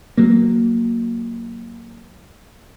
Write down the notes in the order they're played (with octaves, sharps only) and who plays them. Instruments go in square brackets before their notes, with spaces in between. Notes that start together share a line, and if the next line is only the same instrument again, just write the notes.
[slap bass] F#3 A#3